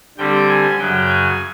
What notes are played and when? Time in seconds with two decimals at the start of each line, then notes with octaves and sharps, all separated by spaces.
0.17 D3 G3 C4 G5
0.48 G#5
0.79 F#2 C#3 F#3 G5
1.09 G#5